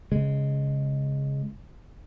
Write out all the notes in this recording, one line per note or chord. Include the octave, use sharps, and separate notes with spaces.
C#3 G#3